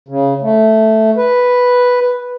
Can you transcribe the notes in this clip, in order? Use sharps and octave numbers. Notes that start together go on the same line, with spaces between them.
C#3
A3
B4